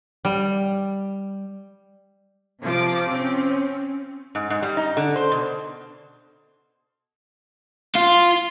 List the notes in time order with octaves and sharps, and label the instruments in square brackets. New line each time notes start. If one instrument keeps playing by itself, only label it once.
[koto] G3
[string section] C3 F3 D6
C4 C#4
[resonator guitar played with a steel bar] G#2
G#2
G3
D#4
D3
C5
B2
[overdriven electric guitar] F4